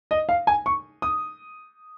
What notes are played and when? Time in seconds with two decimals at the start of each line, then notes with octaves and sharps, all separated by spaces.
0.11 D#5
0.29 F5
0.47 G#5
0.66 C#6
1.02 D#6